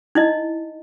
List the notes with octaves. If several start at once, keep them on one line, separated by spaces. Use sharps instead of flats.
D#4 E4 D#5